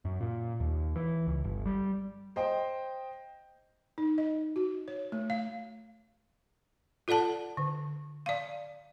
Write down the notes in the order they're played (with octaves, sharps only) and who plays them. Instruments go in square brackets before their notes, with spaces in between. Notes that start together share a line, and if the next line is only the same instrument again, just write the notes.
[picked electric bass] F#2
A#2
D#2
E3
C#2
G1
G3
[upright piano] C5 D#5 G5
[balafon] D#4
D#5
F#4
C#5
A3
F5
F4 A4 D5 F#5 A5
D3
D5 F5